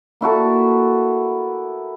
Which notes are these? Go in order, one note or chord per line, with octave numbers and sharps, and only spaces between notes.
A#3 E4 F#4 A4